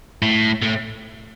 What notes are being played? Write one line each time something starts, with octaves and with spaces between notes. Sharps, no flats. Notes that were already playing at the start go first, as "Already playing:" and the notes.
A2
A2